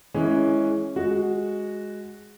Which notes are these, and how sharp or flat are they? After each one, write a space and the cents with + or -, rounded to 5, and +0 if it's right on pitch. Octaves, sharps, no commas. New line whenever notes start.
E3 +0 G#3 +15 C#4 +0
G#3 +0 F#4 +0